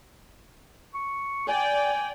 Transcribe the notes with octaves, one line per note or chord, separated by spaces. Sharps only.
C#6
D5 G5 G#5